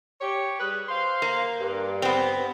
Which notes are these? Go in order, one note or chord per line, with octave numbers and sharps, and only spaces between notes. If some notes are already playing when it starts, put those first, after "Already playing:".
G4 C#5
G3 G#4 B4
C5 F5 C6
A#3
G2
B3 C4